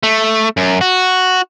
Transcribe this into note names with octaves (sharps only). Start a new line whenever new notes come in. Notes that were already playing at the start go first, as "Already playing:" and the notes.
A3
F#2
F#4